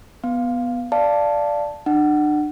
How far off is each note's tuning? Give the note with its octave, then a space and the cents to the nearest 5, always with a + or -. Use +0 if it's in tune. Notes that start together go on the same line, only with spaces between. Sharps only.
B3 +0 F5 +0
D5 +0 F5 -15 A5 +0
D4 +40 F#5 +15